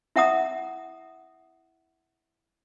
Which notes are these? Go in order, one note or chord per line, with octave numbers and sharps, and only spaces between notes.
E4 E5 F#5 A#5 D#6